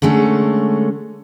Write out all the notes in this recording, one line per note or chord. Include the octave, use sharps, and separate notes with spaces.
D3 G#3 A3 C#4